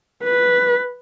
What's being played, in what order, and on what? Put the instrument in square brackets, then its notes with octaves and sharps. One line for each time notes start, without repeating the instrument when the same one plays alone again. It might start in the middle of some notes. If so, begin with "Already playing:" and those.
[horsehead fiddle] B4